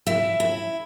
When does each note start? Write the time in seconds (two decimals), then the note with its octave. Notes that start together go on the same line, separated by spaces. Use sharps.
0.07 E4 E5
0.40 E4